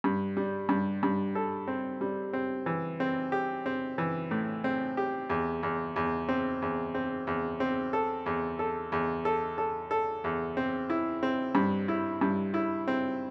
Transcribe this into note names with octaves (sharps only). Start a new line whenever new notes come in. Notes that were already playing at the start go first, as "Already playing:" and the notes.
G2
G3
G2
G2
A4
C4
G3
C4
E3
C4
G4
C4
E3
A2
C4
G4
E2
E2
E2
C4
E2
C4
E2
C4
A4
E2
A4
E2
A4
A4
A4
E2
C4
E4
C4
G2
E4
G2
E4
C4